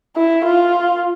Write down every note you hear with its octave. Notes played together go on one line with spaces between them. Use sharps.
E4
F4